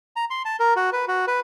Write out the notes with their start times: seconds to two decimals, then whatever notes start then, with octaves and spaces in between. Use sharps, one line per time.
0.16 A#5
0.30 C6
0.45 A5
0.60 A#4
0.76 F#4
0.93 B4
1.08 F#4
1.27 B4